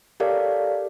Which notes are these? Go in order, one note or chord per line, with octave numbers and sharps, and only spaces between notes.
G4 A4 A#4 C#5 D5 F5